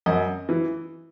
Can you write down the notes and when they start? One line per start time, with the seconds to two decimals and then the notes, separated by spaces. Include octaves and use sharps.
0.06 F#2 D#5
0.49 E3